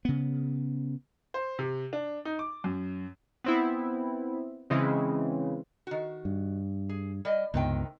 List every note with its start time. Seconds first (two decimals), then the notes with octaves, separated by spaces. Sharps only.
0.05 C#3 B3
1.34 C5
1.59 C3
1.93 D4
2.25 D#4
2.39 D6
2.64 F#2
3.44 B3 C4 E4
4.70 C#3 E3 G#3 C4
5.87 D#3 F#4
6.25 G2
6.89 G#4
7.25 G3 D5 D#5
7.54 C#2 G2 C3 D#3 B3 G5